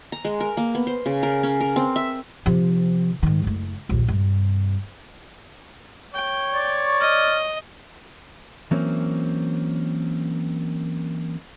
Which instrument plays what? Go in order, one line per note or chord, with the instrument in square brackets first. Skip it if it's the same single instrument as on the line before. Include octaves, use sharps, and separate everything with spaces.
[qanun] A#5
G#3
A#4
A#3
B3
C5
C#3
A#4
C#4
A#4
C4
E5
[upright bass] C3 F3
G#2 D#3
F#1 A3
A#1 D#2
G2 C3
[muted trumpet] C#5 [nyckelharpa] G5
[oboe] D5 [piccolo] C#6
[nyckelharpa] D#5 [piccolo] F6
[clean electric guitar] E3 F#3 A#3 C4 C#4